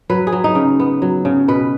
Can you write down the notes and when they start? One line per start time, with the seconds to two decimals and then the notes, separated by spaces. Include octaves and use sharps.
0.10 F#3 B4
0.27 G#4
0.32 F#3
0.44 D#4
0.55 C#3
0.80 B3
1.02 F#3
1.25 C#3
1.48 B2 B4